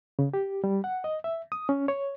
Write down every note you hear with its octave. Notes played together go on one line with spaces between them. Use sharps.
C#3
G4
G3
F#5
D#5
E5
D#6
C#4
C#5